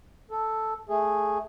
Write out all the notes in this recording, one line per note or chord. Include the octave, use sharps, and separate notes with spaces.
A4
A3 G#4